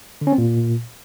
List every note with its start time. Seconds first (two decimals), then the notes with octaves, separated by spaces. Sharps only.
0.21 D3
0.27 C#4
0.33 C4
0.38 A#2